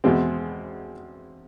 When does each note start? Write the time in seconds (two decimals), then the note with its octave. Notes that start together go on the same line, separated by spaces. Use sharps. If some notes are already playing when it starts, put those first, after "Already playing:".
0.04 E2 B2 G#3 C4